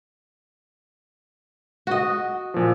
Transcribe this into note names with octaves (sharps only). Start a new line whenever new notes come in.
F#4 D#5
A#2 F3